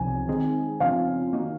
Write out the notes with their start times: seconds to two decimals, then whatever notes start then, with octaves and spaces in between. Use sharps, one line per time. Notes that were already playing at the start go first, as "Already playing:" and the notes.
Already playing: C2 C3 F3 G#5
0.27 D#3 G#3 C4 D#4 G#4
0.80 C#3 F3 C4 F4 F5
1.33 D#3 A#3 D#4 F#4